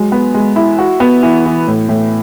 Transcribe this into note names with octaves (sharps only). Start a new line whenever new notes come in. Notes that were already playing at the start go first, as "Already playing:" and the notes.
Already playing: F#3 G#3
B3
G#3
E4
F#4
B3
E3
E3
A2
A2